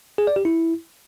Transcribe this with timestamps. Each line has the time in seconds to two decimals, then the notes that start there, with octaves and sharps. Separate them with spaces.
0.18 G#4
0.27 D5
0.36 G4
0.45 E4